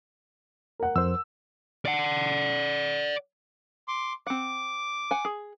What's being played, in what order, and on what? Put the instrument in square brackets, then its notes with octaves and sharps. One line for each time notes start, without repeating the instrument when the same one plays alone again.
[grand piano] A#4 F#5
[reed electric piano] F2 C5 [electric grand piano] E6
[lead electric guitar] D5 F#5
[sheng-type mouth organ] C6 D6
[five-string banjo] C4 F#5 [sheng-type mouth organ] D6
[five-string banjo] F#5 G#5
G#4